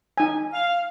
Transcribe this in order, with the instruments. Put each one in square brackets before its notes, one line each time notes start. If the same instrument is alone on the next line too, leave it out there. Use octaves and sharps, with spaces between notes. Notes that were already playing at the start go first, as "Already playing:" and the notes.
[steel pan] D#4 G#5
[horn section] F5